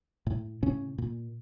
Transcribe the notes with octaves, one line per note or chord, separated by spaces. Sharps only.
A2
A2 C#3 C#4
A#2